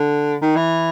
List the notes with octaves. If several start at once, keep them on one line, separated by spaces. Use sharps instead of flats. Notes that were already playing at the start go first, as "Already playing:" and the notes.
Already playing: D3
D#3
E3